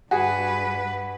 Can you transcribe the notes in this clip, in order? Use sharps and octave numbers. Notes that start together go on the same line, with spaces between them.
G2 F#4 G#4 B4